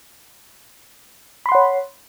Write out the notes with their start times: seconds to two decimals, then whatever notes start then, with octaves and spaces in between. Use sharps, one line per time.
1.46 B5
1.49 C6
1.52 F#5
1.55 C#5